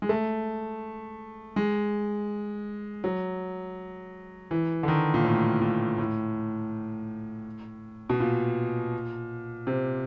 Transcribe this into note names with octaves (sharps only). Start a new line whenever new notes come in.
G#3
A3
G#3
F#3
E3
D3
D#3
A#2
A2
A#2
A2
B2
A#2
C3